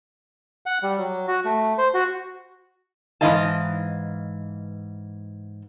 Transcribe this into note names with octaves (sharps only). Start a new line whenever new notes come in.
F#5
G3
F#3
F#4
A3
C5
F#4
G#2 E3 D#5 F5 A5